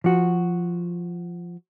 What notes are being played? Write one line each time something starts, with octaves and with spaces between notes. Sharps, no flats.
F3 F#4